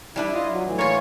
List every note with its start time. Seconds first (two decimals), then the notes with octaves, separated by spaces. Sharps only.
0.16 G3 D4 E4 B4
0.33 E4 F4 D#5
0.49 F#3
0.64 A2 E3
0.79 A#3 F4 C#5